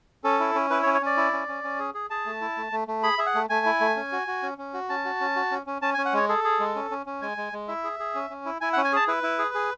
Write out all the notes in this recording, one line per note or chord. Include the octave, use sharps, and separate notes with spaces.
C#4 A4
E4
C#4
E4 B4
C#5
C#4
C#5
C#4 D5
E4
C#4
C#4
C#4
G#4
G#4
G#4 A5
A3
E4
A3
A3
A3
G#4 B5
G#4 E5
F#5
A3
A3 G#5
E4
A3
C#4
F#4
F#4
C#4
C#4
F#4
C#4 A5
F#4
C#4
F#4
C#4
C#4
C#4 A5
G#5
C#4
F#5
G#3 C#5
G#4 A4
G#4
G#3
C#4
C#4
C#4
G#3 G#5
G#3
G#3
E4 E5
G#4
G#4
C#4
C#4
E4
E4 G#5
F#5
C#4
G#5
G#4 A5
E4 B4
E4
G#4
G#4